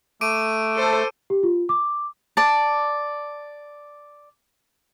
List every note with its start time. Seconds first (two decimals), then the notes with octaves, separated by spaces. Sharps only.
0.21 A3 D6 D7 D#7
0.76 A4 C5 A5
1.30 G4
1.43 F4
1.69 D6
2.37 D5 A5